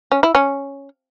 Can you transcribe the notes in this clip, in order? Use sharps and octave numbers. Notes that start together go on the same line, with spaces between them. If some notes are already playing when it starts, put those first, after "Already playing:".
C#4
E4
C#4